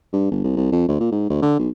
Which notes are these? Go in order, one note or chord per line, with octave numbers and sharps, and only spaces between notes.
G2
G1
C2
C2
F2
D2
A#2
G#2
D2
D3
B1